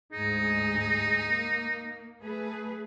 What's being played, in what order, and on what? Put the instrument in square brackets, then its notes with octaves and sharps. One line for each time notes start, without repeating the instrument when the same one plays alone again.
[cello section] D2 G#2 G#4 [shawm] D#4
[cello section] A#3
A3 G#4 B4